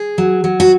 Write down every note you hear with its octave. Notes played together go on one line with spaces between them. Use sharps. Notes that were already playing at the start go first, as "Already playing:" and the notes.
Already playing: G#4
F#3
F#3
F#4